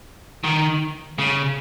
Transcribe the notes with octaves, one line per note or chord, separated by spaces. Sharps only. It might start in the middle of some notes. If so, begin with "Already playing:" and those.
D#3
C#3